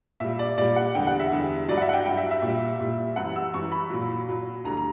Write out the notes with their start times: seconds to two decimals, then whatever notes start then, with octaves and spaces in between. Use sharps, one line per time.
0.20 A#2 G3 E5
0.39 D5
0.58 A#2 G3 D5
0.76 F#5
0.95 E2 D3 G3 G5
1.07 F#5
1.20 E5
1.32 E2 D3 G3
1.69 G2 F#3 D5
1.77 F#5
1.82 E5
1.89 F#5
1.93 G5
2.05 G2 F#3 G5
2.17 E5
2.31 E5
2.42 A#2 G3
2.80 A#2 G3
3.16 F#2 E3 G3 F#5
3.36 E6
3.54 F#2 E3 G3 C#6
3.72 B5
3.90 A#2 F#3
4.27 A#2 F#3
4.64 D2 D3 G3 A#5
4.77 A#5